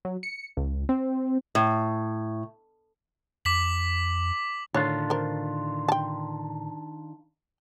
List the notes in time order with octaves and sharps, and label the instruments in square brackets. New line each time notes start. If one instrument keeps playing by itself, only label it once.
[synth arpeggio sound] F#3
C#7
C#2
C4
[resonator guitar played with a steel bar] A2
[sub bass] F2 [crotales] D6 B6 F#7
[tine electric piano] A2 D3 [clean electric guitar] D#3 D4 F4 [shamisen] C#5
[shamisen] A#4 C5
G5 A5